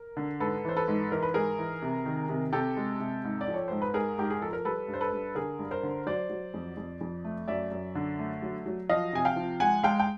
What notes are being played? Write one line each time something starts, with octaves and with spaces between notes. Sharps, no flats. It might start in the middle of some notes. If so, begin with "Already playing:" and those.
Already playing: A#4
D3
G#2 A4 B4
E3 C5
A4 B4
G#2
E3 A#4
B4
G#2 G#4 A#4
E3
C3
D#3
C3
C3 G4 A4
G#3
C3
G#2
D5
F3
C#5
G#2 C5
B4
G#2 G#4 A#4
G#2 G4
G#4
F3 A4
A#4
G3 A4 B4
G2
C5
A4 B4
G2
D3 G#4 A#4
G2
A#4 C5
D3
F#3 C5 D5
F#3
F2
F2
F2
A3
F#2 D5 E5
F#2
D3
A3
F#3
F#3
F3 D#5 F5
C3 G#5
F5 G5
F3
G#3 F#5 G#5
G#3 F5 G5
G5